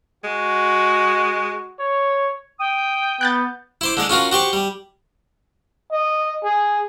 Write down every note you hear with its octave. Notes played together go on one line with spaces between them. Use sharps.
G#3 F#4
C#5
G5 D#6
B3 F#6 G6 A6
E4 C5 D6
D3 G#3 D5
C#4 F4 F#4 A#4
F#4 G4 C5 C#6
G3
D#5
G#4